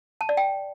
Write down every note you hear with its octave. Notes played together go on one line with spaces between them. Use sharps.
A5
D5
G5